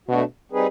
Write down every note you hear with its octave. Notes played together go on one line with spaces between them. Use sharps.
B2 A3 D4 F#4
G3 C4 D#4 G#4 B4